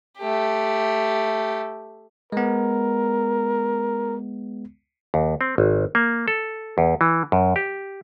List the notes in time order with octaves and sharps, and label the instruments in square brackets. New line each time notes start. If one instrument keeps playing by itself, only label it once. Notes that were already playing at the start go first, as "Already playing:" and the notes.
[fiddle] A3 G4
[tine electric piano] G#3 B3 [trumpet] A#4
[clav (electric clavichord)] D#2
C4
G#1
A#3
A4
E2
E3
F#2
G4